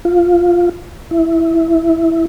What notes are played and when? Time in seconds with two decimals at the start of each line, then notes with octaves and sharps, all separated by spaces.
0.05 F4
1.11 E4